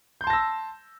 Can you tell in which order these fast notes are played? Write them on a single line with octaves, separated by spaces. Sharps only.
G6 C6 A5 A#6 E6